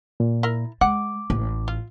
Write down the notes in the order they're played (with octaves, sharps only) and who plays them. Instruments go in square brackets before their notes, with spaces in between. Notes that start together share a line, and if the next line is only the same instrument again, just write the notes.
[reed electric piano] A#2
[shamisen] E4 A#4
[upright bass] G#3 [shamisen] F#5 [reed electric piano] D6
[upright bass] A1
[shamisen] F4